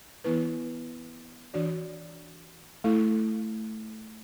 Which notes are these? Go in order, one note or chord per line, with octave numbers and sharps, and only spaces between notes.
E3 B3 E4 B4
E3 D4 F#4 D5
A3 E4 A4